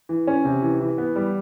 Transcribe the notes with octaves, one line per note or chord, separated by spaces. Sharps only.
E3
C#4
C3
E3
E3
B3
G3